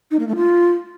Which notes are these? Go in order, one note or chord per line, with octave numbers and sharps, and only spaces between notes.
D#4
A#3
A3
F4